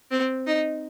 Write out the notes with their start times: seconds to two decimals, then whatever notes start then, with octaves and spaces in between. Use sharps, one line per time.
0.11 C4
0.47 D#4